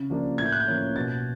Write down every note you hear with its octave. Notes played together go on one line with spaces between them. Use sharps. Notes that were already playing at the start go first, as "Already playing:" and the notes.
Already playing: C#3
F3 A#3 D4
A2 G#6
G6
F#6
G6
F3 A#3 C#4
B2 A6